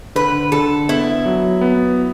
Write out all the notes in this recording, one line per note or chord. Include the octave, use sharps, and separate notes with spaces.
D3 B4
D3 A4
B3 E4
F#3
B3